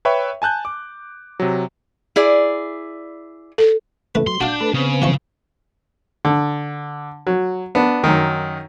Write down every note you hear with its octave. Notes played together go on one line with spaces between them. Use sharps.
B4 C#5 E5 G5 B5 C#6
G#5 A5 F#6 G6
D6
C3 F#3
E4 G#4 D5
A4
C#3 E3 A3 B4
F#3 C6
D4 F#4 F5 G6
A3 A4 B4
C#3 B3 C4
E3 F3 C#6
D3
F#3
B3 D4
F#2 D#3